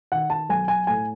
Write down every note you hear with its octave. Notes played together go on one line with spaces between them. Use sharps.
D#3 F#5
A5
B1 G#5
G#5
A2 G#5